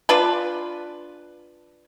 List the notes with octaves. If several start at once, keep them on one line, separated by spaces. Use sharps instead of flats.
D4 F4 B4